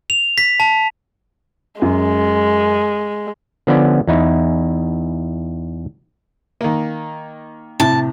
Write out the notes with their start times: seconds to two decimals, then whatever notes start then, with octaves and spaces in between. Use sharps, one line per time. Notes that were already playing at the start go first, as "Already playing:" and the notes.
0.10 F7
0.38 B6
0.60 A5
1.82 F#2 G#3
3.67 D3 F3 B3 C#4 B4 D5
4.07 E2 D#4 E4
6.61 D#3 A#3
7.80 A2 C3 A5